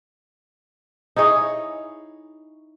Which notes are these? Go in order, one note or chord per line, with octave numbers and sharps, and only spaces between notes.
D#4 E4 G#4 C#5